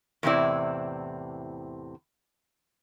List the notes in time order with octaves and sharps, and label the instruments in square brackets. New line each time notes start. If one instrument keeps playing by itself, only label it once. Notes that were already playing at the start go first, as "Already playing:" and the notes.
[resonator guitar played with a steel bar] E2 A2 C3 C4 E4 D5